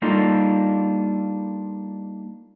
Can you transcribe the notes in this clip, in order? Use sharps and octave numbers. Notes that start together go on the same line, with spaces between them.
G3 A#3 D4 D#4 F4 A4